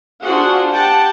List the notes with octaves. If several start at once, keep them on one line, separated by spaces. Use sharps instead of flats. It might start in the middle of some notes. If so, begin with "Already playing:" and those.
D4 F4 F#4 G#4 C5 F#5
G4 F#5 G5 A5